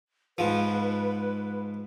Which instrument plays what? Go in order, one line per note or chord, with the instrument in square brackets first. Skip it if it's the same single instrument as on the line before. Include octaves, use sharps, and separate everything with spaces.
[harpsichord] G#2 F3 [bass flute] B4